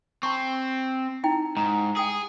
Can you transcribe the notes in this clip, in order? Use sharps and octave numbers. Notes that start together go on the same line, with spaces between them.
C4 A5 C6 C#6
D#4 E4 G5
G#2 A#5
G#4 G5 D#6